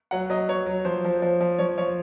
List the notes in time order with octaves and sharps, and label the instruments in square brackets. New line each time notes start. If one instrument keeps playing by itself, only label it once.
[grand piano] F#3 F#5
F#3 D#5
F#3 C#5
F#3
F3 C5
F3
F3
F3
F3 C#5
F3 C#5